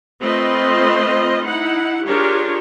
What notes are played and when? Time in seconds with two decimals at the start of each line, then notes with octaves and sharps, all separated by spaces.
0.21 A3 C4 F4 B4 D#5 C6
1.46 D#4 E4 F#5
2.07 D4 F4 G4 G#4 A#4 C#5